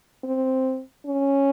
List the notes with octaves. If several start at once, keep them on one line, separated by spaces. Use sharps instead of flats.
C4
C#4